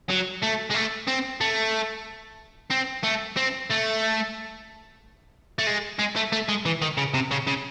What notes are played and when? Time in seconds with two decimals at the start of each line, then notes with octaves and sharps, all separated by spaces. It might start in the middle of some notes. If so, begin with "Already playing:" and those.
0.09 F#3
0.42 A3
0.70 G#3
0.74 A3
1.07 C4
1.41 A3
2.71 C4
3.04 A3
3.37 C4
3.70 A3
5.59 A3
5.67 G#3
5.99 G#3
6.16 A3
6.32 A3
6.49 G#3
6.66 E3
6.82 D#3
6.98 C#3
7.14 C3
7.31 C#3
7.47 C#3